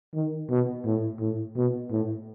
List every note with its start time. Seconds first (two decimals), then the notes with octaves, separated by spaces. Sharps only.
0.14 D#3
0.50 B2
0.85 A2
1.20 A2
1.56 B2
1.90 A2